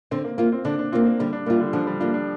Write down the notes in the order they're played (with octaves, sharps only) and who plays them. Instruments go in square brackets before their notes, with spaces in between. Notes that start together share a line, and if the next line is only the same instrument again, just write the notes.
[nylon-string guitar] D3 [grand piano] C4
[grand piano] A#3
[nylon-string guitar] A#3 F4
[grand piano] C4
[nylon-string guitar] D3 [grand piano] D4
[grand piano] D4
[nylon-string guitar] A#3 F4 [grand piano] C4
[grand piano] A#3
[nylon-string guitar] D3 [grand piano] G3
[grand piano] D4
[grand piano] G3 [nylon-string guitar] A#3
[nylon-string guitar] F4
[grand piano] D3
[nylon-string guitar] D3 [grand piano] F3
[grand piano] G3
[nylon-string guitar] A#3 F4 [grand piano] D4
[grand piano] D4